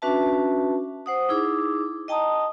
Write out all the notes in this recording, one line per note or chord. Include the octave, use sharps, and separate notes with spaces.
C#4 D4 F#4 B4 E5 A5
C5 F#5 D#6
D#4 E4 G#4 D6
D#5 G5 A5 A#5 D#6